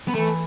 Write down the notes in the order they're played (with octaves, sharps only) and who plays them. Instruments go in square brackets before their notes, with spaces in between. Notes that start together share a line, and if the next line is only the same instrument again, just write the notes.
[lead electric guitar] B3
[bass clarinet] E3 [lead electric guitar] A3